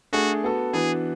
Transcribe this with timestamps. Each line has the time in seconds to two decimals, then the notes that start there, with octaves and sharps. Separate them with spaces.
0.13 A3 D4 F#4 G#4
0.43 B3 F#4 A4
0.73 E3 B3 D4 F#4 G#4 B4